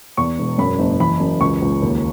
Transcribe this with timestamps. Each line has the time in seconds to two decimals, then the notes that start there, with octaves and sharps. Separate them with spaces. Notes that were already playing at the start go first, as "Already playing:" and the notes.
0.17 E2 C#6
0.39 E1
0.58 F#2 B5
0.79 F#1
1.00 E3 B5
1.20 F#2
1.40 C#2 C#6
1.62 C#2
1.82 D#2